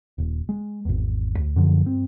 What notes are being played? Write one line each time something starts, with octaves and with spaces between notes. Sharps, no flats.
D#1
G#3
G#1 E2
D2
F#2 D3 F3
G2 C4